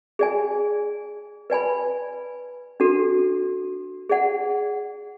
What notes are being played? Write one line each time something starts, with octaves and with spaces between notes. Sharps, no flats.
G#4 D5 G#5
B4 D5 G#5 B5
D4 F#4 A4
G#4 D5 F#5